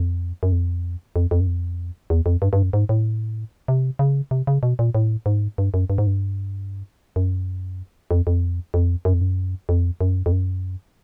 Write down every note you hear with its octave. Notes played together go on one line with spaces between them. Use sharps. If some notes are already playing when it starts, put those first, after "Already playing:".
Already playing: F2
F#2
F2
F2
F2
F#2
F2
E2
F2
G2
G2
F#2
G#2
A2
C3
C#3
C3
C#3
B2
A#2
A2
G#2
G2
F#2
G2
G#2
G2
F#2
F2
F2
F2
F#2
F2
F#2
F2
F#2
F2
F#2